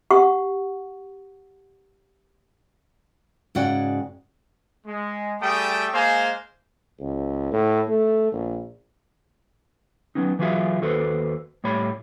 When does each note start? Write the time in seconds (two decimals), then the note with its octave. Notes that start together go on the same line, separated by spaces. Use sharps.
0.11 G4 F#5 C#6
3.55 G#2 C#3 F#4 D5 F#5 G5
4.87 G#3
5.41 G3 A3 G#4 G5 A5 D#6
5.93 G#3 A#3 G#4 C5 F5 G#5
7.00 C#2
7.52 A2
7.88 A3
8.32 A#1
10.15 F#3 B3 C#4 D#4
10.39 E3 F#3 F4 F#4 G#4 E5
10.81 D#2 F#4 A4 B4 C5
11.64 A2 G3 C#5 B5